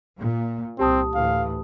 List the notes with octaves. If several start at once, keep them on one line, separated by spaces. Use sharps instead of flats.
A#2
C2 C4 G4 A5 D#6
D2 A2 E3 F5